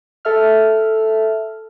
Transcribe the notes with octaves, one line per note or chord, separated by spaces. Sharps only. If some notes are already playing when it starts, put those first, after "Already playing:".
A4 E5 F6